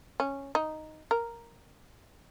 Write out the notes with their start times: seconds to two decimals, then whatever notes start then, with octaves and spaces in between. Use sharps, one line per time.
0.20 C#4
0.55 D#4
1.11 A#4